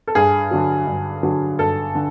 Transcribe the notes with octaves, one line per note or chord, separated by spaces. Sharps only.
A4
G2 G#4
D3 F#3
G2
D3 F#3
G2 A4
D3